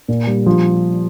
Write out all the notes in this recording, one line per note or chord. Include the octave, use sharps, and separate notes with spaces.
A#2
G3
F3